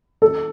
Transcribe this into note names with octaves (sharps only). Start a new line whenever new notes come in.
A4